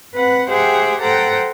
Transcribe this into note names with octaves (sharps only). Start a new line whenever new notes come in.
C4 B4 F#5
G4 G#4 C5 E5 F#5 G5
A4 C5 F#5 G5 A#5